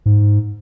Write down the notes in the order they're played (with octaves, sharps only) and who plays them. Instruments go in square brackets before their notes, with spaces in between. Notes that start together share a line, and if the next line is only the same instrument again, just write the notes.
[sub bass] G#2